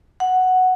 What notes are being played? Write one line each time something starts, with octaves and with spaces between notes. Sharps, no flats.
F#5